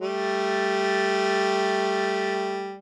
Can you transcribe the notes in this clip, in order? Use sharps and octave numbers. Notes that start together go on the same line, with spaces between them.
G3 A3